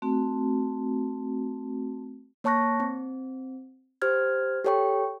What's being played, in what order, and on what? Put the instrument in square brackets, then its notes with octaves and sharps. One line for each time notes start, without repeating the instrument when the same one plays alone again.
[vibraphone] A3 C4 F#4
[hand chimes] A#3 C#5 A5 C#6 F#6 A#6
C4
G4 C5 F6 G#6
G4 A4 C#5 G5 C#6